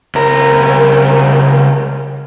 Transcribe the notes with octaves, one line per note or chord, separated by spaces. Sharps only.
C#2 A#4